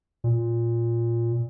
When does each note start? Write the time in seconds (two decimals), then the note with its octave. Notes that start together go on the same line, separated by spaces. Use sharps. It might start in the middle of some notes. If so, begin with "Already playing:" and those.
0.24 A#2